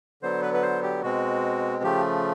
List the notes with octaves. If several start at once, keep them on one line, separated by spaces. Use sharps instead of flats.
D3 F#3 B3 C5
B4
B4
C5
G4
B2 G#3 C4 F#4
C#3 F3 A3 G4